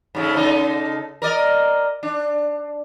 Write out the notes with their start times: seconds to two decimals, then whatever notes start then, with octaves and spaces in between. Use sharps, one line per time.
0.15 G#2 C#3 A3
0.36 C#3 D#4 A4
1.22 A#4 D5 D#5
2.03 D4